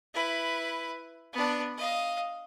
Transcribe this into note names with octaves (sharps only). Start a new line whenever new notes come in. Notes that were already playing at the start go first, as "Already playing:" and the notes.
E4 B4
B3 D4
D#5 F5